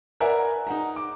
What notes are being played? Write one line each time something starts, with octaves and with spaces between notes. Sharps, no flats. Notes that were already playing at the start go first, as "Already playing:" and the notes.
A#4 B4 D5 E5 F#5 G#5
D#4 F#5 A#5
D6